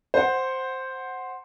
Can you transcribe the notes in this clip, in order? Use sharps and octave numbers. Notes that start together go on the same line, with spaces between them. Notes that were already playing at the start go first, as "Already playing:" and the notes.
C5 F#5